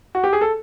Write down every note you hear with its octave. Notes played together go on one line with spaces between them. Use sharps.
F#4
G4
G#4
A4